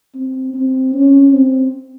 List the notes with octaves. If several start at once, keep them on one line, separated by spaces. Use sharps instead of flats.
C4
C4
C#4
C4